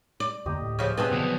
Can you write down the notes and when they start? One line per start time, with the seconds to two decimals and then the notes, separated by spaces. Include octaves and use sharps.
0.20 D5
0.46 E2 D3 A#3 G4 D#5
0.60 D1 A2
0.79 C#3 F3 F5
0.98 B2 B3 C4 D4 G#4 F5 D#6
1.12 B1 B2 D3 D#3 F3 F#5 G5